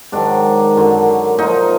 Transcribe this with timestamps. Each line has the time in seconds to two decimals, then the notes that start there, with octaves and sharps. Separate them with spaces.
0.12 G#2 D#3 F#3 D4
0.76 F#2 D3 F#3
1.38 A#2 F3 D#4